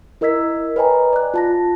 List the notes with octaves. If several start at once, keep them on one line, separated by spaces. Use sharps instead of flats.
E4 A#4 D#5 E6 G#6 B6
B4 C#5 D#5 G5 G#5 A#5
D5 F#6
F4 A5 A#6